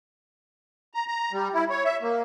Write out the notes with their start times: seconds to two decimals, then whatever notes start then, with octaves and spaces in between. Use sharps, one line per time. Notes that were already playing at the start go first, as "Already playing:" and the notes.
0.94 A#5
1.08 A#5
1.32 G3
1.54 E4
1.70 C#5
1.85 E5
2.02 A#3